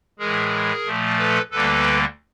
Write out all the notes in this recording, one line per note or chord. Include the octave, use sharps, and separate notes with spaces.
A2 E3 G#3 G#4 A#4
A#2 F3 A3
A4 B4
D2 D3 G3 A#3 A4 B4